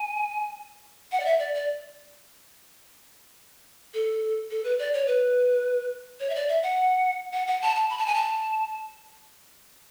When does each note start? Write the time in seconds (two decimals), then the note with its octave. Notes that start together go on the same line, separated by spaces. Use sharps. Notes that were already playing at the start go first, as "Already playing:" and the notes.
Already playing: G#5
1.12 F#5
1.20 D5
1.25 E5
1.39 D5
1.54 D5
3.94 A4
4.51 A4
4.64 B4
4.79 D5
4.93 C#5
5.07 B4
6.20 C#5
6.30 E5
6.35 D5
6.49 E5
6.63 F#5
7.33 F#5
7.47 F#5
7.62 A5
7.76 A5
7.90 B5
7.98 A5
8.06 G#5
8.14 A5